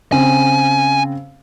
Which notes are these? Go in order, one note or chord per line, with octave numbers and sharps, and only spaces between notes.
C#3 C4 G#5